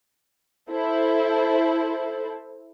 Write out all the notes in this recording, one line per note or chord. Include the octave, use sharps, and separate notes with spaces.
E4 A4 C5